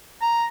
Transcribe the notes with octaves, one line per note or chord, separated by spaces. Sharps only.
A#5